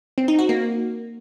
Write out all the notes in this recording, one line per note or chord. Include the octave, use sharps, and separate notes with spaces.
C4
D#4
F#4
A#3